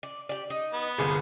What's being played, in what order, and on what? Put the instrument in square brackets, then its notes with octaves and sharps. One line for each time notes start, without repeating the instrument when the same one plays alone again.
[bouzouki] D5
G4 D5
D#4
[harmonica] B3
[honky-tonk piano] G1 C2 C#7 [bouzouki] G#4 A#4 C5